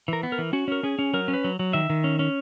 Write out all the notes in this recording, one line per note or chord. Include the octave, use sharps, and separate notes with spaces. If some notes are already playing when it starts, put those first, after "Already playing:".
E3 A#4
B3
A#4
E3
C#4 F#4
C#4 A#4
C#4 G#4
C#4
F#3 A#4
C#4
B4
F#3
F#3
D#3 E5
D#3
C#4
C#4